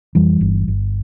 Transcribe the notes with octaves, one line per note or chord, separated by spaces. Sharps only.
F2 E3 G3
G1
G1